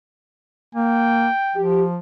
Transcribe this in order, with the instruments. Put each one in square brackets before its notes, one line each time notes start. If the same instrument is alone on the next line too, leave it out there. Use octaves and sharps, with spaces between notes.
[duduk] A#3 [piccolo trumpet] G5
[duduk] F3 [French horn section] G4